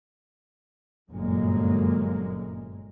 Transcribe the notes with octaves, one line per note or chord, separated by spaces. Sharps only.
G1 F#2 A#2 G#3 A#3